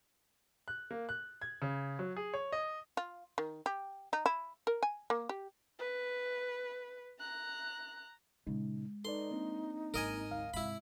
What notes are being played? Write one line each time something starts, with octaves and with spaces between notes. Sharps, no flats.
F#6
A#3
F#6
G#6
C#3
F#3
G#4
C#5
D#5
F4
D#3
G4
D#4
E4
A#4
G#5
A#3
G4
B4
A#5 F#6
A#2 C#3 G#3 D#4
D#4 A4 B4 D5 C6
A#3 C4 D4
G#1 F#3 A#4 D#5 G#5
D2 F5
G#2 C3 E4 B5